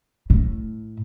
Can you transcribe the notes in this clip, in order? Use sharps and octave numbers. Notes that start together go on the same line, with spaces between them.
A2